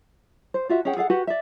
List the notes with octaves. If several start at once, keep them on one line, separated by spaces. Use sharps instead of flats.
C5
F4 F#4 E5
C#4 G#4 F#5 G5
G#4 A4 F5 F#5
F#4 G4 B4 F#5
D5 E5